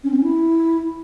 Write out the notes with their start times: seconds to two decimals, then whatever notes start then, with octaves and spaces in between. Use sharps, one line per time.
0.04 C#4
0.10 C4
0.17 C#4
0.23 E4